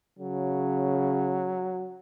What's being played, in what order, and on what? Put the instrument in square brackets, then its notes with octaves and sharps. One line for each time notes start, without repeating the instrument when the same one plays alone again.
[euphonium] C#3 [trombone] F#3